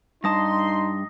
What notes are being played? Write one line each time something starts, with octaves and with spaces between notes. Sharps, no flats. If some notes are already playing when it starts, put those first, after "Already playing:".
G2 D#4 A5 C6 D#6 A#6